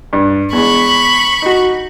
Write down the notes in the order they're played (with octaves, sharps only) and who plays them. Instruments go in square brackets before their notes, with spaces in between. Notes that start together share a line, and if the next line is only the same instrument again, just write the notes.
[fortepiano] G2
[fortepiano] E2 G#3 [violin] B5 C#6
[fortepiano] D#4 F#4